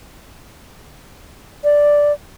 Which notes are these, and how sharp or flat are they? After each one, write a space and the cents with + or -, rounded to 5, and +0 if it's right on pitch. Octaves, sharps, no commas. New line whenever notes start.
D5 -5